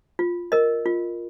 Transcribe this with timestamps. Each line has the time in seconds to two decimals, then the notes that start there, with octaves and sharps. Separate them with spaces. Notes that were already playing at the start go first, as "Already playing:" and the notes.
0.19 F4
0.52 A#4 D#5
0.86 F4